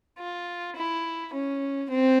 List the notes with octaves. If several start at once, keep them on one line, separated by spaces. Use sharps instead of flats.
F4
E4
C#4
C4